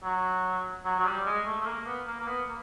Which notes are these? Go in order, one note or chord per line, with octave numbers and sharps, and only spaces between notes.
F#3
F#3
F#3
G3
G#3
A3
A3
A#3
B3
A#3
A#3
B3
A#3